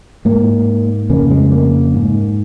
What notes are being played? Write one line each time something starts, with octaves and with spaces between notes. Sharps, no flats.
G#2 A#3
F2 C#3 A#3
G#3
A#3
G#2